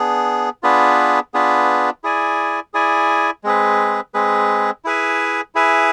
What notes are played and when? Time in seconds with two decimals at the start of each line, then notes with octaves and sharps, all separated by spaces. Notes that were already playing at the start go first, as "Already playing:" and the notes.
Already playing: B3 D4 G#4
0.63 B3 D4 F4 G#4 B4
1.34 B3 D4 F4 G#4 B4
2.04 E4 G#4 D5 G#5
2.74 E4 G#4 D5 G#5
3.44 G#3 C4 G#4 B4
4.14 G#3 C4 G#4 B4
4.85 E4 G#4 B4 E5 G#5
5.55 E4 G#4 B4 E5 G#5